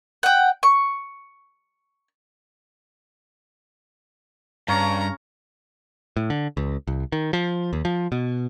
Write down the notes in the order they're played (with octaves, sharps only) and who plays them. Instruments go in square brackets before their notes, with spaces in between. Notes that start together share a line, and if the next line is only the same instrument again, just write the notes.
[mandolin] F#5 G5
C#6
[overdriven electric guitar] G2 [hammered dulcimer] C#3 C#5 F5 [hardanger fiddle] A#5
[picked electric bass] A2
D3
C#2
C2
D#3
F3
D#2
F3
B2